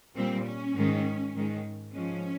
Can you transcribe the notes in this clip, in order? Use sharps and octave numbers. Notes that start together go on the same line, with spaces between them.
A#2 G3 C4
C#4
G#2 D#3 G#3
G#2 D#3 G#3
G#2 F3 G#3 C#4